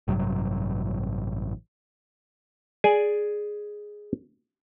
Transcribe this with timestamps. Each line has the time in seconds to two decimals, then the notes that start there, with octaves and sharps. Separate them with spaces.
0.08 A1 G2 C3 F#3
2.84 G#4 D5 G#5